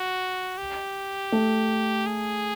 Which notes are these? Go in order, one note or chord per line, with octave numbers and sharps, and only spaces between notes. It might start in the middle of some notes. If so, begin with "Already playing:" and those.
Already playing: F#4
G4
A3
G#4